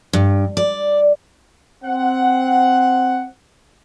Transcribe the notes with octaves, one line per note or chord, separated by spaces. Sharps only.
G2
D5
C4 F#5